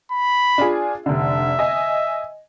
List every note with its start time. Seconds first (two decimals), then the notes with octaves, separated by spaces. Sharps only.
0.12 B5
0.58 D4 F4 G#4
1.06 F1 D3 E5
1.59 D#5 G#5